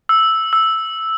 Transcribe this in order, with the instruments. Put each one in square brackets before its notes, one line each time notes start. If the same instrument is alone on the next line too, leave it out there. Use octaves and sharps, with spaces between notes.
[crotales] E6
E6